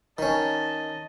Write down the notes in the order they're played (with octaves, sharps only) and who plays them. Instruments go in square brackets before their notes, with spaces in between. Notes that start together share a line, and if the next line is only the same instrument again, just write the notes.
[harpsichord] D#3 C#4 [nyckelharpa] D#5 A5